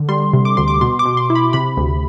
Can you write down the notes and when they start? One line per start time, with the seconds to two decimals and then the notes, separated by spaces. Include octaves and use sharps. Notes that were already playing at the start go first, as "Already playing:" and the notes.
Already playing: D3
0.09 G3 C6
0.33 C3
0.45 D6
0.57 D2 C6
0.68 D6
0.81 B2 C6
0.99 D6
1.05 B2
1.17 C6
1.30 E4
1.35 B5
1.53 C3 B5
1.77 D2